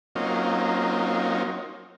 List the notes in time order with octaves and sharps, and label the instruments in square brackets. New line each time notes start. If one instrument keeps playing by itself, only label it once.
[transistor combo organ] F#3 A#3 C4 C#4 D#4 F4